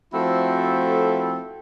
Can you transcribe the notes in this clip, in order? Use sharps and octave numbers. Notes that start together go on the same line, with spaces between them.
F3 A3 C4 E4 F#4 A4